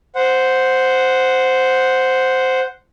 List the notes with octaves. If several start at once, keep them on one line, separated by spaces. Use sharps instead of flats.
C5 F#5